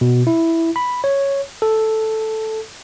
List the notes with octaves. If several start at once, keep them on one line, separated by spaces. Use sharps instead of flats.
B2
E4
B5
C#5
A4